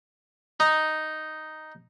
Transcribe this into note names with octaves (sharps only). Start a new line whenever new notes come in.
D#4